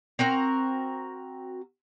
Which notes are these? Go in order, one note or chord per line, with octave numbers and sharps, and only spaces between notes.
C4 F#4 A#4 A#5